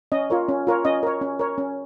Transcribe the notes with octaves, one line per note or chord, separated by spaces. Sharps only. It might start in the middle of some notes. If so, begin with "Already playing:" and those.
C#4 D#5
F4 A#4 C#5
C#4
F4 A#4 C#5
C#4 D#5
A#4 C#5
C#4
A#4 C#5
C#4